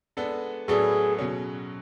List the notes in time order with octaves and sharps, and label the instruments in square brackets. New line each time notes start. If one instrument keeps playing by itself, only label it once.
[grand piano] G#3 B3 D4 A4
[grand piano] A2 F#3 B3 D4 A4 [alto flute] G#4
[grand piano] B2 F#3 C#4